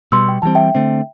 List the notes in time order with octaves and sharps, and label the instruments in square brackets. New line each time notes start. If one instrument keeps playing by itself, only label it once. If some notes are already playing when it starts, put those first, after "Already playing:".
[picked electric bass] B2 G3 B3 [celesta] C6 E6
[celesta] G5
[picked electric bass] E3 G3 C4 [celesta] A5
[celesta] E5 G5
[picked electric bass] D3 A3 C4